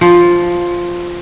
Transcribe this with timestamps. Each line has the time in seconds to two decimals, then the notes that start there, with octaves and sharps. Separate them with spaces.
0.01 F3